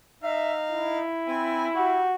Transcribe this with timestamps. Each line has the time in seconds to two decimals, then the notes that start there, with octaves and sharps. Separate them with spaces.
0.22 D#4 E5 F5
0.70 E4
1.27 C4 G#5
1.75 F#4 G4